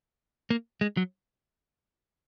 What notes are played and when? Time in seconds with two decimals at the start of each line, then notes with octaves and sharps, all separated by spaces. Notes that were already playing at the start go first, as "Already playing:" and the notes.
0.50 A#3
0.81 G#3
0.97 F#3